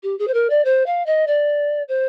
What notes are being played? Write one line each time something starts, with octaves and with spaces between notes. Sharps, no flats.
G4
G#4
C5
A#4
D5
C5
F5
D#5
D5
C5